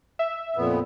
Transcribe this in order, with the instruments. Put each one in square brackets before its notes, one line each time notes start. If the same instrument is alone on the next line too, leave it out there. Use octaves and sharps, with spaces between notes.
[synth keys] E5
[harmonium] F2 A#2 B3